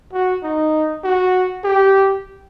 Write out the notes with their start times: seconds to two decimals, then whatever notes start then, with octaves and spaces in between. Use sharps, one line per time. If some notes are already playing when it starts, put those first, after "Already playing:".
0.13 F#4
0.43 D#4
1.04 F#4
1.64 G4